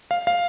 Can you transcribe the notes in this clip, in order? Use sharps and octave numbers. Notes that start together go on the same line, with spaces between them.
F5
F5